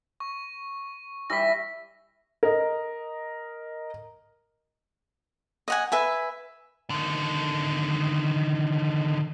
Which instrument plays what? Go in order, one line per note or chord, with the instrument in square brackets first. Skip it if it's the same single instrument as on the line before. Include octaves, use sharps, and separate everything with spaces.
[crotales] C#6
[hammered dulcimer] E3 G3 E5 [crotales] A#6 B6
[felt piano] A#4 D#5
[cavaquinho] D#5 F#5 G#5
B4 E5 G#5
[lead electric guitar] D3 D#3